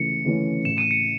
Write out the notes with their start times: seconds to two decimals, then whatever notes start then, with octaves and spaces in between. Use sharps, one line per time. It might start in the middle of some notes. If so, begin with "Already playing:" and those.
Already playing: C#2 C#3 E3 A3 C#7
0.25 C#3 E3 A3 C#4
0.65 A2 E7
0.78 D#7
0.91 C#7